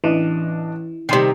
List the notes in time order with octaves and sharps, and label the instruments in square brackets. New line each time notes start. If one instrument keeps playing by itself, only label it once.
[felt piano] A1 D4 D#5 [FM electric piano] E3
[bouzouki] C3 D#3 [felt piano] G3 C6 C7